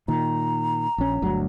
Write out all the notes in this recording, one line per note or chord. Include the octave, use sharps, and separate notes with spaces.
A#2 D#3 A#5
A#1 C#4
G1 D2 F#3